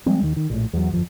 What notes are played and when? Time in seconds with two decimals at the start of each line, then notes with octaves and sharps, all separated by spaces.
0.06 F3 G3 G#3 C4
0.22 D#2 D#3
0.36 D#3
0.50 A#1 A2
0.73 E2 F#3
0.91 G1 F2 F3